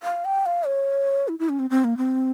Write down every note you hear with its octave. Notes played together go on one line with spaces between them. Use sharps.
F5
G5
F5
C#5
E4
E4
C#4
C4
C4
A#3
C4